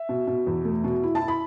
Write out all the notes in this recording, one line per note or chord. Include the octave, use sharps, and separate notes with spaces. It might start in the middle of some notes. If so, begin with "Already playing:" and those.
Already playing: E5
B2
B2
E2
A3
B2
E4
A5
E4
B5